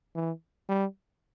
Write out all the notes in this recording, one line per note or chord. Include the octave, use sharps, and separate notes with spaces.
E3
G3